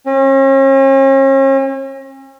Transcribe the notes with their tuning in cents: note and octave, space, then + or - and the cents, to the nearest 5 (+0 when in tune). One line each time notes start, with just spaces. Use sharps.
C#4 -40